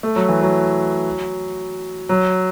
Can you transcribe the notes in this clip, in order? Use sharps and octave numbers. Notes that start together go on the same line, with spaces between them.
A3
F#3
E3
F#3
F#3